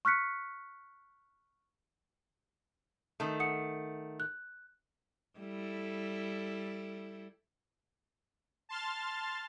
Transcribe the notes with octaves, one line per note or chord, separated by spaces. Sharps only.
C#6 F6 F#6 B6 C#7
D#3 A3
F#5 D#6 C#7
F#6
G3 E4 A4
A5 C6 F6 A6